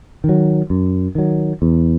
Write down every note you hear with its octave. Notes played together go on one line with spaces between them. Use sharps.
D#3
F#3
F#2
D#3 F#3
E2